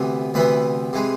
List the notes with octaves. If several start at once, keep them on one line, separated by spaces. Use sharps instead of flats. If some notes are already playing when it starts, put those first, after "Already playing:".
Already playing: D2 C3 E3 B3
D2 C3 E3 B3 B4
C3 E3 G#3